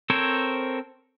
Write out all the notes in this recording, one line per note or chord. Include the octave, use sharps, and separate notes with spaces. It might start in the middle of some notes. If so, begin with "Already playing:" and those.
C4 A4 A#4 C5 C#5